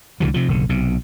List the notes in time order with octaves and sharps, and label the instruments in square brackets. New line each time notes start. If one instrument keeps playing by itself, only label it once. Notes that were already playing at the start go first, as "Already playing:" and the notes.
[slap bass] C#2 D3 E3 F#3
C3 F3
F#1 B1 D3
B1 C3